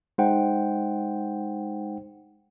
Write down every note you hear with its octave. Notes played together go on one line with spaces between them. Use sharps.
G#3 D#4 C5 F#5 G5